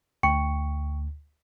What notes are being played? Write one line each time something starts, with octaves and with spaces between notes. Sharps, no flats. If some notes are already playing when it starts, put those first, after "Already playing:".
D2 G5 C#6 C#7